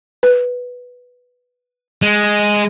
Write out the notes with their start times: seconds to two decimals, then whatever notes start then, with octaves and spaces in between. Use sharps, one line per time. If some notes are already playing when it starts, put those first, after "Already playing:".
0.23 B4
2.02 G#3